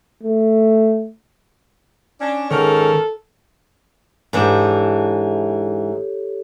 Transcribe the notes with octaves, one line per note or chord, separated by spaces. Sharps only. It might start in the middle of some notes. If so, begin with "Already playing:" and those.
A3
C#4 D4
G#2 D#3 C#4 A4 A#4
G#2 E3 D4 G4 A4 C#5